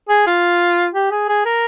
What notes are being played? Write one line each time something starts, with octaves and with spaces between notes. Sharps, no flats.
G#4
F4
G4
G#4
G#4
A#4